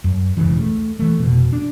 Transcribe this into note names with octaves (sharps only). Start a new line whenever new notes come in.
F#2
E1 C#2 C#3 E3
A3
E3 A3
F1 B2
D4